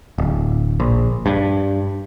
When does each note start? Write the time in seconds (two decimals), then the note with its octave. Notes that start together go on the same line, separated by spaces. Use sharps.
0.18 D1
0.80 A#1
1.26 G2